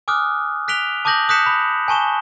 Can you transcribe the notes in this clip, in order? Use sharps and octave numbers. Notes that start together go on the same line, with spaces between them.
G#5 D6 D#6 F6 F#6
F#6 B6 D7 F7 G7
A5 D6 D#6 G6 A#6 F#7
D#6 F#6 G6 B6 C#7 E7
B5
G#5 A5 C#6 E7 G7